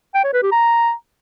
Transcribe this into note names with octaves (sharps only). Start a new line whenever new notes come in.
G5
C#5
B4
G4
A#5